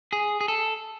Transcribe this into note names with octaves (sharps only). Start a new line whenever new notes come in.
G#4
G#4
A4